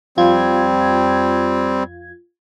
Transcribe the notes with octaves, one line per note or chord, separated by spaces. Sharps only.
F2 G3 C4 F4 G#6